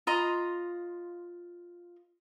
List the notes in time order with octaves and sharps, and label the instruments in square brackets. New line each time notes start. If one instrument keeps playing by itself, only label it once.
[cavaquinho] F4 D#5 A#5 C6